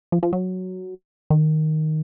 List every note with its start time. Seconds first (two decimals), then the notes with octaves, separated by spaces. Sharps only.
0.12 F3
0.23 F3
0.33 F#3
1.30 D#3